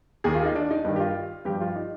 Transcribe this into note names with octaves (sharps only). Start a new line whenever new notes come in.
D#2 D#3 G#4
F4
D#4
D4
D#4
G2 D#3 D4
G4
F4
G2 F3 G4
F4
D#4